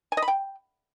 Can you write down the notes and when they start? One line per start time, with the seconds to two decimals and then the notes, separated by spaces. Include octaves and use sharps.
0.12 G#5
0.17 D#5
0.22 B5
0.28 G5